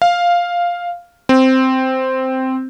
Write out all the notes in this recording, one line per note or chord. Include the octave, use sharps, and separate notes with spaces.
F5
C4